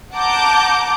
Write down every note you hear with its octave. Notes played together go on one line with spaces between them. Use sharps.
F#5 A5 A#5 D6 G6